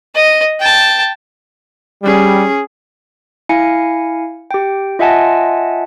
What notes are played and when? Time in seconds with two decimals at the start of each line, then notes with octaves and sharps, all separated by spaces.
0.15 D#5
0.60 G5 A5
2.04 G3 C#4 G#4
3.49 E4 F5 G#5 C#7
4.51 G4 G5
4.99 F4 D#5 E5 F#5 G#5 A5